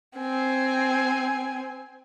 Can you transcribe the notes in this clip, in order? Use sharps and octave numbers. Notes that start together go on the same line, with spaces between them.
C4 G#5